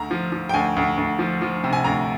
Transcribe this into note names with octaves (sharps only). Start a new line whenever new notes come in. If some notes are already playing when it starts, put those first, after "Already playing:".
Already playing: D2 A#5
F3
F3
G5
D2 G#5
D2
D2
F3
F3
C3
G#5
D2 A#5